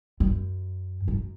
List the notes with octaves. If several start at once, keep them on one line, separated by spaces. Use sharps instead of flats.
F#2
F#2